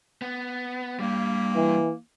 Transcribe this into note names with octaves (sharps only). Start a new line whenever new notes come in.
B3
G2 G3 A#3
E3